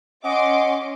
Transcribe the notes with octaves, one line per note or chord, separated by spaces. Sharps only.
C#4 D#5 F#5 C6 D6